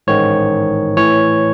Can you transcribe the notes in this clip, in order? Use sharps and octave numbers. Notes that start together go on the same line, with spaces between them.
A1 G#2 D#3 C#5
A2 E3 C#5